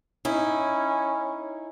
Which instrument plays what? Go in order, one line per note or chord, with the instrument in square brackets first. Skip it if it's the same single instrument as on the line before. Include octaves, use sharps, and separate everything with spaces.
[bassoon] C#4 [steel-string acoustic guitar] D#4 E4